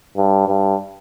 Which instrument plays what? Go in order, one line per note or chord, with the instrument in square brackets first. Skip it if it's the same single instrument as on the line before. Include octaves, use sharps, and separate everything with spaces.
[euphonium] G2
G2